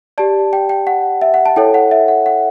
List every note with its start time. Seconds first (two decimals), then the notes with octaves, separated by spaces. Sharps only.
0.18 G4 D5 A5
0.53 G5
0.69 G5
0.87 F#5
1.21 E5
1.34 F#5
1.46 A5
1.56 E4 A4 C#5 G5
1.74 F#5
1.91 E5
2.08 F#5
2.26 F#5